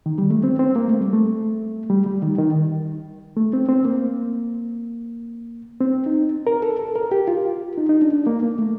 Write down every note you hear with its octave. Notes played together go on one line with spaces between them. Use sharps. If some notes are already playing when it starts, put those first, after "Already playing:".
D#3
G3
A3
C4
C4
A#3
A3
G3
A3
G3
G3
D#3
D#3
A3
C4
C4
A#3
C4
D#4
A#4
A4
A4
A#4
G4
F4
D#4
D#4
D4
D4
A#3
A#3
A3